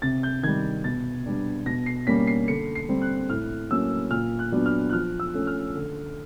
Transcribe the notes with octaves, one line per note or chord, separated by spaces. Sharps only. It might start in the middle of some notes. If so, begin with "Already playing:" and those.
C3 A6
G6
D#3 G3 G#6
B2 A6
G3 B3 D4
B2 A#6
C7
G3 A#3 C#4 B6
C7
D3 C#7
C7
G3 C4
F#6
A2 F6
F#3 A#3 C#4 E6
A#2 F6
F#6
F#3 B3 D4
F6
F#6
F3 F6
E6
A3 C#4
F6
D3